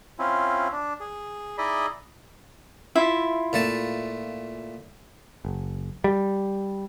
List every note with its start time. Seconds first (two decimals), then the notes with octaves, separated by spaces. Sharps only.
0.19 C4 C#4 E4 F4
0.72 D4
1.00 G#4
1.58 D#4 E4 G#4 D5 D#5 B5
2.95 E4 F4 E5
3.53 A#2 A3 A5
5.45 F#1
6.04 G3